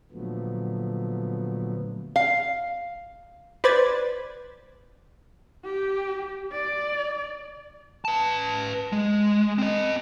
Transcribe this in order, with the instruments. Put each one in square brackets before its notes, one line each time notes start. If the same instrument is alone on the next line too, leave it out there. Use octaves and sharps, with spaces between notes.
[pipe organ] A#2 D3 F3 F#3 A3 B3
[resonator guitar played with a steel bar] F5
[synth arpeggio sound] B4 C5 D5 B5 G#6 A6
[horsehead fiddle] G4
D5
[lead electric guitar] B4 A5
G#3
C4 D#5